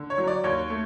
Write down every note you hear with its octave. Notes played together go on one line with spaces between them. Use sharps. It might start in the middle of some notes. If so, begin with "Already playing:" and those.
Already playing: D3
C#5
F#3
D5
D#2 C#5
A3